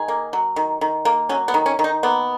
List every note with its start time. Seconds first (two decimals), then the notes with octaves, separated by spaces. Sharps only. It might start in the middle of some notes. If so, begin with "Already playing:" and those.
Already playing: D#3 G#4
0.08 A#3
0.33 F#3
0.56 D#3
0.81 D#3
1.05 A#3
1.29 F#3 C#4
1.48 B3
1.54 D#3
1.66 C#4
1.79 D#3
1.84 D#4
2.03 A#3 B3